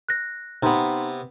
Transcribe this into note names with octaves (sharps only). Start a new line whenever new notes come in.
F#6 A#6
C3 B3 D#4 A#5 C6